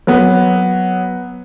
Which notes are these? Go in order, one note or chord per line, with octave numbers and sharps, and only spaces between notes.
F#3 B3